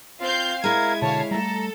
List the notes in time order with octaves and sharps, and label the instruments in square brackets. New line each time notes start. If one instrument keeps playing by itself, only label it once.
[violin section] C4 F5 G6 [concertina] F4
[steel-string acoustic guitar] G#3 E4 [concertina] A#4 F5 [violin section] G#6
[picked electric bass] B2 D3 [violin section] C#5 F5 [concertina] A5
[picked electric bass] G3 A3 [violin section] A4 [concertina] A#5